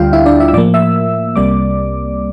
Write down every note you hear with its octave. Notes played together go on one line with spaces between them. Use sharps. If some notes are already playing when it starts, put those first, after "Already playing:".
Already playing: D2 D3 G3 D4 F4 F5 G5
E4 E5
D4 D5
E4 E5
E6
A2 F3 A#3 D5 D6
E5 E6
C2 C3 G3 A#3 D5 D6